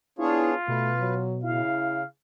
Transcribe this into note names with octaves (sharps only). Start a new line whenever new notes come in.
B3 D4 E4 F4 G#4 C#5
B2 A3 B4
F#3
C#3 E4 F5